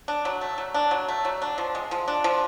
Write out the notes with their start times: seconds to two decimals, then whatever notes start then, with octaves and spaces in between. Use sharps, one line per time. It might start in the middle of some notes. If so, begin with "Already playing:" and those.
0.08 D4
0.25 F#3
0.41 A3
0.58 F#3
0.74 D4
0.91 F#3
1.08 A3
1.25 F#3
1.42 D4
1.58 F3
1.75 G#3
1.91 F3
2.08 D4
2.24 F3